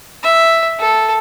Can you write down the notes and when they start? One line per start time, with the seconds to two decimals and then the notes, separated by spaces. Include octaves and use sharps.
0.23 E5
0.79 A4